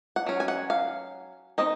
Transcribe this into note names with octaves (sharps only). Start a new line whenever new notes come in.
F#5
F#3 C#4
G#5
F#5
F5
C4 D#4 D#5